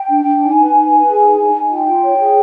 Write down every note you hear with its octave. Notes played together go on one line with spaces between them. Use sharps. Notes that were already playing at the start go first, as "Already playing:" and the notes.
Already playing: G5
D4
D4
D#4 G#5
B4
D#4
B4
G#4
D#4
D#4
D#4
F4 G5
F4
C#5
G#4